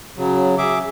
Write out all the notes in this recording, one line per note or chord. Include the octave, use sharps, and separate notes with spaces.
C#3 F#3
G#4 E5 D6